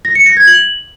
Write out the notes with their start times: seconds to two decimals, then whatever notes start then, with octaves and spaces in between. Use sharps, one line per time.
0.05 A#6
0.15 C#7
0.26 A#6
0.37 G#6
0.47 F#7